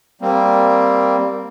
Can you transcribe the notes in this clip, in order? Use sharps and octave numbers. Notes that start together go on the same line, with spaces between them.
G3 A#3 C4